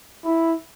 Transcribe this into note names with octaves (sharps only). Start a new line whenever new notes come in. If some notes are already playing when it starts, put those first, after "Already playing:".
E4